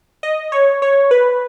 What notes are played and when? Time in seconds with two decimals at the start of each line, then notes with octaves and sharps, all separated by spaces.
0.23 D#5
0.52 C#5
0.82 C#5
1.11 B4